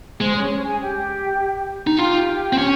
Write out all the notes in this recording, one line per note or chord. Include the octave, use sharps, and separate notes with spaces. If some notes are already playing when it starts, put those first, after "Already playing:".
G#3 C5
C#4 C#5
C#4 C#5
G#4 G#5
G4 G5
D#4
F4 G4 G5
C4
C#4